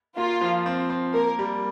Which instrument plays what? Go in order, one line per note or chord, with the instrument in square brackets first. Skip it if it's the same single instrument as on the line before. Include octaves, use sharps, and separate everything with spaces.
[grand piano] A#3 [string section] F4
[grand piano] F3
C4
C4
[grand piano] A#3 [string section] A#4
[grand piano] G3